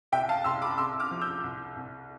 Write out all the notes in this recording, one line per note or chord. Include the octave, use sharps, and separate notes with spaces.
C2 E5 G5
F5 A5
C2 C6 E6
B5 D6
C3 C6 E6
D6 F6
F3
E6 G6
C2
C2